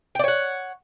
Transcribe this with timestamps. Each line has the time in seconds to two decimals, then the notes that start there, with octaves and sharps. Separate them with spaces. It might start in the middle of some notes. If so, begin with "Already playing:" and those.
0.15 G5
0.19 D5
0.24 C#5
0.28 F#5